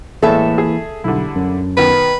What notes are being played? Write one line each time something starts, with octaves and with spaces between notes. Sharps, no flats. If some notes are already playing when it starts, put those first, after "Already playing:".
A2 E3 G#3 A#3 E4 A4 E5
G#4
B1 D3 G3 E4
F#2
B2 D#3 B4